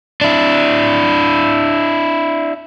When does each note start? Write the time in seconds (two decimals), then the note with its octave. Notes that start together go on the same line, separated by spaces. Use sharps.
0.21 D4 E4